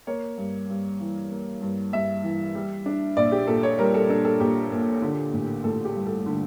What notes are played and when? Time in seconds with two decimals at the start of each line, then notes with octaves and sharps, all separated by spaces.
0.07 A#3 C#5
0.38 G2
0.69 G2
1.01 E3
1.31 A#3
1.62 G2
1.93 G2 E5
2.24 E3
2.55 G3
2.86 D4
3.17 A#1 D5
3.32 G4
3.47 A#2 A4
3.63 C#5
3.79 G3 A#4
3.94 A4
4.09 D4 A4
4.25 A4
4.40 A#1 G4
4.72 A#2
5.02 D3
5.33 A1
5.64 A1 A4
5.85 G4
5.95 G2
6.06 A4
6.26 D3